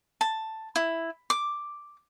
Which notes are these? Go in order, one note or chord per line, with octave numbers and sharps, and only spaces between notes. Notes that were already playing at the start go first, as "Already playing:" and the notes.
A5
E4
D6